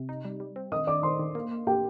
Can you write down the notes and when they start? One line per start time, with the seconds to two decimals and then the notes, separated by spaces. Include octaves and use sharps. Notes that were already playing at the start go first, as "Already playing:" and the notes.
Already playing: C3
0.09 D#4
0.25 G3
0.40 G3
0.56 C4
0.72 D#3 D#5 D#6
0.87 D#3 D5 D6
1.03 D#3 C5 C6
1.19 D#3
1.35 A#3
1.51 A#3
1.67 A#3 G4 G5